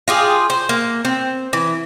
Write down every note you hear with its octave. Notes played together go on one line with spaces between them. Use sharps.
F4 G4 G#4
C5
A#3
C4
E3